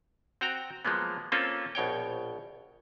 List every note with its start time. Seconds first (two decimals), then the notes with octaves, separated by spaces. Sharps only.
0.41 C4 F#4 G5 A#5
0.85 F3 F#3 G#3 A#3 B3
1.32 A#3 C4 C#4 F4 A4
1.75 A#1 B2 C#5 G5